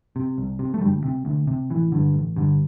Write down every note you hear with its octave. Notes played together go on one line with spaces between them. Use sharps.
C3
C2
C3
A3
D2 G2 G3
C3
D2
C3
A1 E3
G2 D3
A1
G2 D3